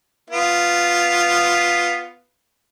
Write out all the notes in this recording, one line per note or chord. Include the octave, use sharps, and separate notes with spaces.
B3 F4